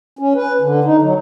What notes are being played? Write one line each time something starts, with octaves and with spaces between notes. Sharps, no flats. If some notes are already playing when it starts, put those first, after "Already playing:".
C#4
B4
D3
D#4
F#3